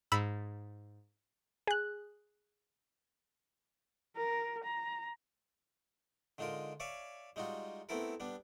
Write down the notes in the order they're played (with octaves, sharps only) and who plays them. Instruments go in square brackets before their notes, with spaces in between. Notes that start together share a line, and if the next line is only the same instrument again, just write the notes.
[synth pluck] G#2 B5 E6
[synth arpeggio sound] G#4 F#6
[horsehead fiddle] A#4
A#5
[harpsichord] D3 G#3 D#4 F4 A#4
C#5 D5 E5 F5 G#5
G3 G#3 D#4 F4 F#4
A3 B3 C4 E4 A4 A#4
G3 B3 D4